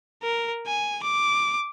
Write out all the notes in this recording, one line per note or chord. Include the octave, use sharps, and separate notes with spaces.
A#4
G#5
D6